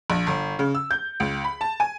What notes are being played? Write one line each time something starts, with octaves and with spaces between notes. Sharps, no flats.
A#1
G1
C#3
E6
G6
C#2
B5
A5
G#5